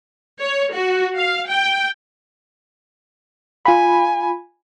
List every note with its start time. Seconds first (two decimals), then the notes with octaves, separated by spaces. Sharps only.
0.39 C#5
0.72 F#4
1.17 F5
1.49 G5
3.65 F4 G#5 B5